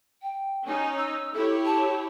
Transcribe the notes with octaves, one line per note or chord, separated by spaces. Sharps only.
G5
C#4 D#4 G#5
E6
E4 G4 A4 C#5
A5